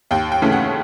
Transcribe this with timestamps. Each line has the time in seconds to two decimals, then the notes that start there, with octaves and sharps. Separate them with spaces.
0.11 D#2 G5
0.32 G5
0.42 C#3 E3 A3 C#4
0.52 F#5